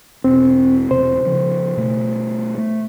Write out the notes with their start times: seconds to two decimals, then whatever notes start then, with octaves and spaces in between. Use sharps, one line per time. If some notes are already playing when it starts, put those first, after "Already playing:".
0.24 E1 B2 C4
0.91 E1 C3 C5
1.25 C#3 F3
1.77 B2 A3
2.58 A3